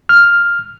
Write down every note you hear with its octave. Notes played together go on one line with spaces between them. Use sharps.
F6